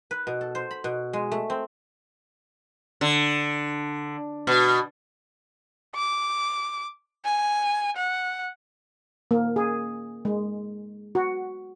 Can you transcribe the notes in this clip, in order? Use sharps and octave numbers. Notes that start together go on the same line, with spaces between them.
B4
B2
A4
C5
B5
B2
G#3
A3
C4
D3
B2
D6
G#5
F#5
A#3
G#4
G#3
F#4